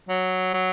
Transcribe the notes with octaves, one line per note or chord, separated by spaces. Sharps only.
F#3
F#3